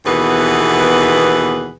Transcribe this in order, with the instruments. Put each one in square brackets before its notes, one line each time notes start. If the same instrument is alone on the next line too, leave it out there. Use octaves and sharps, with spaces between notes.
[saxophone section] D#2 B2 E3 B3 G#4 B4